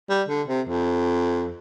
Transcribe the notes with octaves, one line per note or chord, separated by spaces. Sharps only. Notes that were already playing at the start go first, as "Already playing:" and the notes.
G3
D3
C3
F2